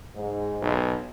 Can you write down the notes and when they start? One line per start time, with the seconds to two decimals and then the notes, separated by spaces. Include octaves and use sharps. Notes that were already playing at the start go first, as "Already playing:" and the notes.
0.15 G#2
0.62 B1